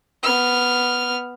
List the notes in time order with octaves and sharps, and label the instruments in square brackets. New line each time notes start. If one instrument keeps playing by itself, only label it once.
[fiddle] B3 F6